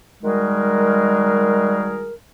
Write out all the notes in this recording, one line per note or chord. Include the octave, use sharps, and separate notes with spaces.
D#3 G3 G#3 F#4 G#4 A#4